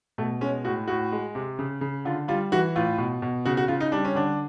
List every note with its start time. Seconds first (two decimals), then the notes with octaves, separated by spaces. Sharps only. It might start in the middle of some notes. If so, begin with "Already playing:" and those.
0.18 B2 A3
0.41 G#3 C#4
0.65 A2 F#4
0.88 A2 F#4
1.12 G#3
1.35 C3
1.59 C#3
1.81 C#3
2.05 D3 F4
2.28 G3 F4
2.52 E3 F#4
2.76 A2 F4
2.98 B2
3.22 B2
3.46 C#3 F#4
3.57 F#4
3.68 C#3 F4
3.80 D#4
3.92 G3 D4
4.05 C#4
4.15 D3 D4